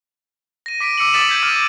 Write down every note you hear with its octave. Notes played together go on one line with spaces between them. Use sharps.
A#6 D#7
D6 B6 D7 D#7
D6 E6 C#7 D#7 F#7
D#6 E6 A6 B6 E7 F#7
G6 G#6 B6 D7
D6 F6